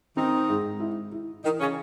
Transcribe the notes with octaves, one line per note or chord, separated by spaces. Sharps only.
D#3 C4 D#4
G#2
E4
E4
D#3 E3 D#4
C#3 C#4